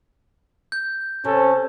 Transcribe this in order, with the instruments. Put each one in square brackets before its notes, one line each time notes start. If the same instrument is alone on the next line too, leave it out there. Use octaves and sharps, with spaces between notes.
[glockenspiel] G6
[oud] C3 [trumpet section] C#4 A4